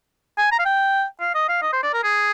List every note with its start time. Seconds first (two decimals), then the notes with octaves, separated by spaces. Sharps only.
0.38 G#5
0.51 A#5
0.59 F5
0.65 G5
1.21 F5
1.34 D#5
1.48 F5
1.62 D#5
1.73 C5
1.83 D5
1.93 A#4
2.03 G#4